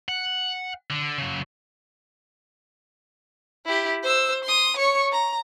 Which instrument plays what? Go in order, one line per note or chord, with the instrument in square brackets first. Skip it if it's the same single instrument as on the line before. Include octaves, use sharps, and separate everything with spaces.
[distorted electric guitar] F#5
D3
C#3 F#3
[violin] E4 G4
C5 E6
C6 D#6
C#5 C#6
A#5